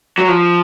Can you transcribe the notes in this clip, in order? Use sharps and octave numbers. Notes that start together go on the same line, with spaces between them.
F#3
F3